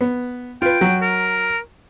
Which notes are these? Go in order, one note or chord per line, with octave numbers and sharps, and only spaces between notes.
B3
F4 B4 G5
F#3
A#4